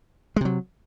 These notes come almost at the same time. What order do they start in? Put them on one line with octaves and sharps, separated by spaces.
G#3 C3 F#3